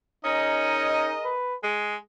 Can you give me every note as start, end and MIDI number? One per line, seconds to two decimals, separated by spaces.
0.24 1.10 61
0.24 0.86 63
0.24 1.36 68
0.24 1.36 70
0.24 1.36 75
0.89 1.13 63
1.25 1.55 71
1.63 1.96 56
1.63 1.97 68